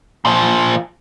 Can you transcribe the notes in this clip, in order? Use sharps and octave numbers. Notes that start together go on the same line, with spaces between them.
A#2 F3